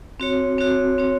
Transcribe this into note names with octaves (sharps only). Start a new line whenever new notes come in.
C4 F#4 C#5
C4 F#4 C#5
C4 F#4 C#5